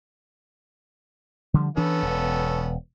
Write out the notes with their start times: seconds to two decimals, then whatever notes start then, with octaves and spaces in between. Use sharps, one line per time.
1.54 D3 F3 G3
1.77 E3 B3 C#4 D4 A4
2.03 E1